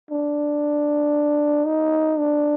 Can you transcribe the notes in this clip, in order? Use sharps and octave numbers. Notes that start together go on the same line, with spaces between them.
D4
D#4
D4